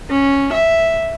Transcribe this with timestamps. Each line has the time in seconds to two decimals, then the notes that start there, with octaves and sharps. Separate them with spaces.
0.10 C#4
0.53 E5